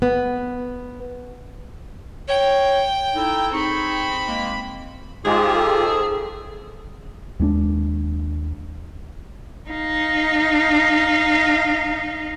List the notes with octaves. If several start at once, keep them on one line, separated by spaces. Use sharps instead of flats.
B3
C#5 G5
D#4 E4 A4
C4 D#4 G#4 B5 C#6
G#3 A#3
G#2 G#3 F4 G4 G#4
A4
D#2 G#3 C#4 D4
D#4 F5